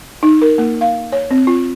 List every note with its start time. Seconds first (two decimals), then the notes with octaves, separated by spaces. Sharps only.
0.23 D#4
0.42 A#4
0.58 A#3
0.81 F5
1.12 C#5
1.31 C4
1.47 F4